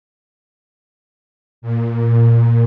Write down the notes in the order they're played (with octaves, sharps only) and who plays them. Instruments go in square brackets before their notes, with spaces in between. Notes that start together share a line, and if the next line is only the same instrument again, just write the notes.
[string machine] A#2